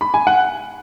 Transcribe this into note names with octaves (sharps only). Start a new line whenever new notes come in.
B5
G#5
F#5